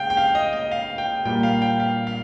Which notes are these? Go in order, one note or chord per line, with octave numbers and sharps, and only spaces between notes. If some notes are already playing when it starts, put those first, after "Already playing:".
Already playing: C#3 G#3 F5 G5
G5
F5
D#5
D#5
F5
G5
A#2 G3 A#3 G5
F5
G5
F5
F5